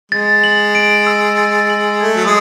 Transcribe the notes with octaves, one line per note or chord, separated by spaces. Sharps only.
G#3 A6
F#7
D7
E6
A6
F#7
A3 G#6
F#3
G#3